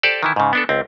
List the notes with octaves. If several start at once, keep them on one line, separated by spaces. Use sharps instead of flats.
G4 A4 C5 D5
D#3 E3 E4
G#2 C#3
B3 D4 A4
C#2 C4